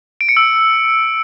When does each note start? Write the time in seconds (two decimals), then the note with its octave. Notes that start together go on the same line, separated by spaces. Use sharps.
0.21 D7
0.29 C#7
0.37 E6